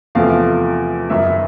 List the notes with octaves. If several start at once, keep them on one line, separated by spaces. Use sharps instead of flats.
E2 C3 F3 A3 F5
G#1 F#2 C#3 E5